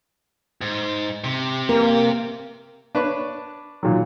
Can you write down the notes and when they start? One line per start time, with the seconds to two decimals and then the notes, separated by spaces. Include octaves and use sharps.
0.61 G#2
1.24 C3
1.69 A#3 A#4
2.95 D4 B4 C#5
3.83 A#2 D#3 F#3